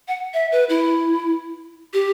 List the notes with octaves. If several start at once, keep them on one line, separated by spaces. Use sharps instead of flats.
F#5
E5
B4
E4
G4